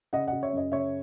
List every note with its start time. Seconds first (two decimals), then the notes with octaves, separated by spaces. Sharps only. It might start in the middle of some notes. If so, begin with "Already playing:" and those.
0.13 C#3 D#5 F#5
0.27 D#5 F#5
0.33 C#3
0.43 C#5 E5
0.53 F#2 D#5
0.72 C#3 C#5 E5